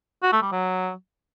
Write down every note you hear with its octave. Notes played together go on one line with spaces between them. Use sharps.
F#4
A3
G3
F#3